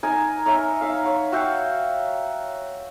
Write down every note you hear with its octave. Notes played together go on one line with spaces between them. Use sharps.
D#4 A#4 G#5
D#4 A#4 C#5 E5
D#4 E5 F5
C#5 F#5
F#4 E5 F5 G5